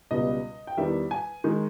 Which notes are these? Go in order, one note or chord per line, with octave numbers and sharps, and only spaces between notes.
C#2 B2 G3 D#5
G5
E2 D#3 G3 E5
G#5
D#3 G#3